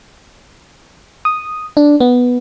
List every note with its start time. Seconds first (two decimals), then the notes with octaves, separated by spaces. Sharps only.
1.25 D#6
1.77 D4
2.00 B3